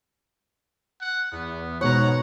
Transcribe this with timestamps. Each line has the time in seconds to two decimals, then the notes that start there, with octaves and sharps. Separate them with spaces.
1.01 F#5
1.32 E2 B3
1.81 G#2 B2 C#5 F#5 A#5